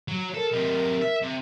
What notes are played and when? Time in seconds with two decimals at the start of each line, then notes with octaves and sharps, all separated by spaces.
0.08 F#3
0.35 A4 A#4
0.53 C3 D#4
1.01 E5
1.22 C3